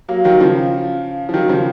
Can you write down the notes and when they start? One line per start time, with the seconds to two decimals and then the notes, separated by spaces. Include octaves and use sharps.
0.09 F#3 A#3
0.24 D#3 F#3
0.40 C#3 F3
1.29 F3
1.34 D#3 F#3
1.49 C#3 F3